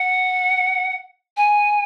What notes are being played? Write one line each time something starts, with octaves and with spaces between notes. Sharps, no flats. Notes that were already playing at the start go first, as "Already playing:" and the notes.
Already playing: F#5
G#5